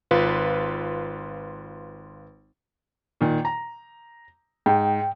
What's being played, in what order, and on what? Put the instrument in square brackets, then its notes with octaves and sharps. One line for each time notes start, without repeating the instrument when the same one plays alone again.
[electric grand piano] G#1 F4 B4
[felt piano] A#2 D#3
A#5
[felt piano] G#2 [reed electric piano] G5